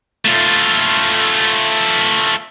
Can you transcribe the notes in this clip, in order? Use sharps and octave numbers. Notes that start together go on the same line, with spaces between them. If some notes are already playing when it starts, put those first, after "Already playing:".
A3 F4